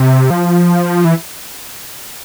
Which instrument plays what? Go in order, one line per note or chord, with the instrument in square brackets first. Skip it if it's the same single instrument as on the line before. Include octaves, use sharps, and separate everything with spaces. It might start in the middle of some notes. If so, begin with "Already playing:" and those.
Already playing: [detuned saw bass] C3
F3
E3